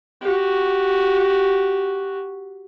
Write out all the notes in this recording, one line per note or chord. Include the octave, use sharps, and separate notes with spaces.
F#4 G4